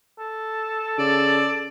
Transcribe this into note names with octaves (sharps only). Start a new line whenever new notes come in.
A4
C#3 D5